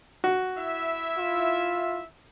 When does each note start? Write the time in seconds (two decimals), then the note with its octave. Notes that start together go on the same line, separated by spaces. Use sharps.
0.24 F#4
0.58 E4 E5
1.17 F4